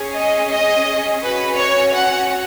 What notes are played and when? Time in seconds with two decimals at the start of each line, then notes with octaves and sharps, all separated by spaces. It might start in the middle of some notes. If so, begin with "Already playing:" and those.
Already playing: C#4 G#4
0.15 D#5
0.51 D#5
1.24 C#4 F#4 B4
1.59 C#5
1.96 F#5